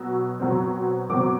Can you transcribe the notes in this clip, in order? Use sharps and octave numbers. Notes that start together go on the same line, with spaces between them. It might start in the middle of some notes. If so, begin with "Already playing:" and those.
Already playing: B2 F#3 E6
B2 F#3 C4
B2 F#3 C4 D6